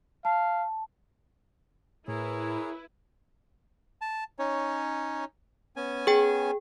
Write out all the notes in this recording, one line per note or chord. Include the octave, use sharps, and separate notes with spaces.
F5 A5
A2 E4 G#4 A#4 B4 C#5
A5
C#4 D#4 C#5
B3 C#4 G#5
G#4 G5